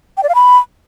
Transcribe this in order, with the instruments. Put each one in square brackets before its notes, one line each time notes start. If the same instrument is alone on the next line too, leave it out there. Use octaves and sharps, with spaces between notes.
[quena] G5
D5
F5
B5